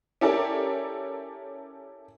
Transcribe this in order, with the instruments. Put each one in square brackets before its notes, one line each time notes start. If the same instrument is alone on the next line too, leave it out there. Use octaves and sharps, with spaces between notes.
[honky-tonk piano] C#4 E4 G4 A4 A#4 D5